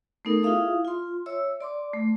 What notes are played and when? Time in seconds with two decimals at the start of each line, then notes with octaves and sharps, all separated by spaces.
0.25 A3 B3 D#4 A4 A#4
0.43 E4 F4 G#4 E5 F5 D#6
0.85 F4 C6
1.26 C#5 E5 E6
1.61 D5 C6 D6
1.94 A3